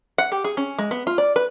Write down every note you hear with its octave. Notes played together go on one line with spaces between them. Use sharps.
F#5
G4
G#4
C#4
G#3
B3
F4
D5
B4